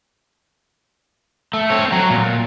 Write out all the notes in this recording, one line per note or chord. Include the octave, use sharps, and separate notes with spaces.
A3
C4 C#5
F#3
A#2